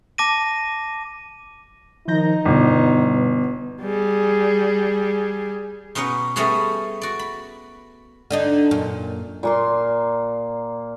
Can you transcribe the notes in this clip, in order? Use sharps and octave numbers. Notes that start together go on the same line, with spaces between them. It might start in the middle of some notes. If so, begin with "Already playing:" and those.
A5 D6 A#6 D#7
D#3 F3 D#4 G6 A#6
G1 B2 G3 B3
G3 G#4
B2 C#4 D#4 B4 F#5
G3 A3 B3 C#4 F#4 G#4
F#4 D5
B5
D3 D4 D#4
F#2 A#2
A#2 A#3 C6